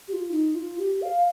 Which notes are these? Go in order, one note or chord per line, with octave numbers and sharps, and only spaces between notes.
G4
F4
D#4
F4
G4
F5